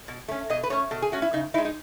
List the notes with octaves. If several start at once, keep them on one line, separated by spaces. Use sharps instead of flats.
B2
A3 C#4
B2 D#5
B4
A3 C#4 C#5
B2 A4
G#4
A3 C#4 F#4
E4
C#3 D#4
D#4 E4
G#3
D#4